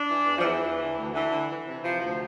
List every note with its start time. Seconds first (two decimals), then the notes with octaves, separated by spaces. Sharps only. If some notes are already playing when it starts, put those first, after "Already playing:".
Already playing: D4
0.09 E3
0.26 E2
0.38 F3
0.43 E2 E3
0.61 E2
0.78 D3
0.96 D2
1.13 D3 E3
1.31 D3
1.48 E3
1.66 C3
1.83 C3 F3
2.01 D2 F3